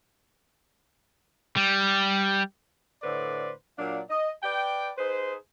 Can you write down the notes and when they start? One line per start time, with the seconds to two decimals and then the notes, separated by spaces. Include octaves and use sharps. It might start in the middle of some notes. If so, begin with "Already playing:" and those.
1.57 G3
3.03 A2 D3 B4 C5 D5
3.78 A#2 F#3 D4 D5 F5
4.09 D#5
4.43 B4 D5 G5
4.98 D#4 G#4 B4 C5